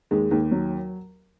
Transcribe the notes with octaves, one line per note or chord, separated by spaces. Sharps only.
D#2 G#3
D#2
F#3